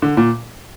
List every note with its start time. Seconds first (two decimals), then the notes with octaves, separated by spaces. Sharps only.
0.02 D3
0.17 A#2